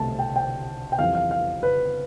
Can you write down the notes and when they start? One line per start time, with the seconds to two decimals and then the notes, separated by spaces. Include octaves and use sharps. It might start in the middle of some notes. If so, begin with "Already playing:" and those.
Already playing: C2 B2 A3 A5
0.19 G5
0.36 G5
0.92 G5
0.99 F2 E3 G3 F5
1.15 F5
1.31 F5
1.63 B4